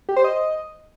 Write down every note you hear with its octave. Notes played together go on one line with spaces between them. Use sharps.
G4
C5
D#5